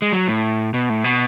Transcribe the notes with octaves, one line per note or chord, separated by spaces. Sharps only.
G#3
F#3
A2
B2
A2
B2